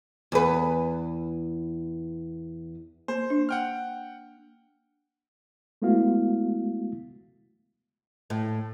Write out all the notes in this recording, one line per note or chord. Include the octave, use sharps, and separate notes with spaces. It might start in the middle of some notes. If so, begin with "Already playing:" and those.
E2 B4
A#3 C5
D4
F#5 G5 F6
G#3 A3 B3 E4 F#4 F5
A2